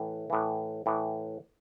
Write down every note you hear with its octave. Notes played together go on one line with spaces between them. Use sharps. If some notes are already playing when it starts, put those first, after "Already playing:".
Already playing: A2 E3
A2 E3
A2 E3